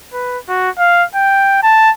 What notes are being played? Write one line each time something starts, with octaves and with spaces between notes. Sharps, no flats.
B4
F#4
F5
G5
A5